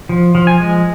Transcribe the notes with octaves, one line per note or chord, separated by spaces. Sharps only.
F3
F3
G#5
G#3